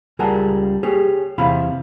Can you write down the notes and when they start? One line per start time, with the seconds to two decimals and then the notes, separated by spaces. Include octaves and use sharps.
0.19 C#2 G3 G#4 A#4 F#5 A5
0.83 G4 G#4 C#5
1.38 E2 C3 E4 F5 B5